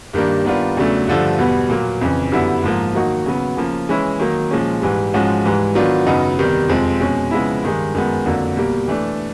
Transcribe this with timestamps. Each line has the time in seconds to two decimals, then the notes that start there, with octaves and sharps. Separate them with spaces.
0.13 G2 D#3 G3 A#3 D4
0.45 D#3 G3 B3 D4 F4
0.77 E2 C#3 F#3 A3 D4
1.08 G2 D3 F3 A3
1.38 E2 B2 G3 B3
1.69 A#2 F#3 A#3
2.01 F2 C#3 E3
2.32 F#2 D3 G3 B3 E4
2.64 G#2 F3 A#3
2.94 D#3 F#3 A#3 D#4 F#4
3.26 C#3 F#3 B3
3.57 C#3 F3 A#3
3.89 E3 G#3 C#4 E4
4.20 D#3 F#3 A#3
4.51 A#2 F3 G#3 C#4
4.82 G#2 E3 G3
5.14 G#2 F3 G#3 C#4 F#4
5.45 G#2 E3 G3
5.75 D#3 F#3 B3 D4 F4
6.06 F#2 C#3 F#3 B3 D#4
6.39 E2 C3 D#3 G3
6.69 F2 C3 F3 G#3 C4
7.00 B2 G#3 C#4
7.31 C#3 F3 G#3 B3 E4
7.63 G2 D#3 G#3
7.95 F#2 D#3 G#3 B3
8.26 F2 D3 F#3 A#3
8.56 B2 G3 A#3
8.88 E3 A3 D4